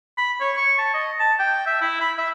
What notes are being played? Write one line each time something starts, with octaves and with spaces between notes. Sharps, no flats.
B5
C#5
C#6
A5
D#5
A5
G5
E5
E4
B5
E5